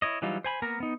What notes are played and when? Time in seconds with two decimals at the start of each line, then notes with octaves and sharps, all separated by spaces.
0.02 E4 C#5 D#5
0.22 E3 F#3 G3 D#4 F4
0.44 C5 G#5 B5
0.62 A#3 B3 A#4 A#5
0.80 B3 D#4